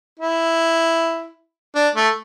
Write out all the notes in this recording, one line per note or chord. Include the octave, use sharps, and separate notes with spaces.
E4
D4
A3